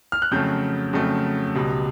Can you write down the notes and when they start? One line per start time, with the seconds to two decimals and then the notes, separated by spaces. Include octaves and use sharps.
0.12 F6
0.22 F#6
0.31 F2 C#3 F#3 A3 G6
0.93 F2 C#3 F#3 A3
1.55 C#2 B2 G3